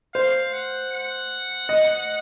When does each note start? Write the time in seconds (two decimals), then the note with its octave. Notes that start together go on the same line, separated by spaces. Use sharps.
0.14 C5 F5
0.53 F#5
0.92 F#5
1.69 D#5